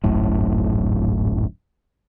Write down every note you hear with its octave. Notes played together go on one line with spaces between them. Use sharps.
D1 G#1 F#2 A2